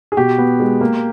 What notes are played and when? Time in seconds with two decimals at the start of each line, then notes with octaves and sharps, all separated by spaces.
0.12 G#4
0.17 B2 G4
0.38 B3
0.60 G#3
0.81 A#3